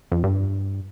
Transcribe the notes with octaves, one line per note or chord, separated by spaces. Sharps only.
F2
G2